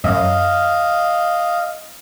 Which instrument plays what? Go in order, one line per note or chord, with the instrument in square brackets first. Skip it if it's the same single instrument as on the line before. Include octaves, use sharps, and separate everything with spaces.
[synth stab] F#2 [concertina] D#5 F5